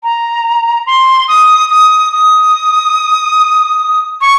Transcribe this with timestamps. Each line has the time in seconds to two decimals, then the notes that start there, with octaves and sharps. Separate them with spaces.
0.03 A#5
0.87 C6
1.28 D#6
1.71 D#6
2.12 D#6
4.21 C#6